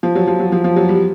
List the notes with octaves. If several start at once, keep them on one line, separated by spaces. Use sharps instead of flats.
F3
F#3
F3
F#3
F3
F3
F#3
G3